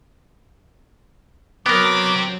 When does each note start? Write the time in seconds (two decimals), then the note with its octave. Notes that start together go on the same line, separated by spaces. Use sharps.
1.66 F#3 B3 C4 G4 A#4 D6